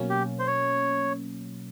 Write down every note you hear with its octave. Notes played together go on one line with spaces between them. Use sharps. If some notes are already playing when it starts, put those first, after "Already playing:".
Already playing: B2 F#3 A#3 C#4
G4
C5
C#5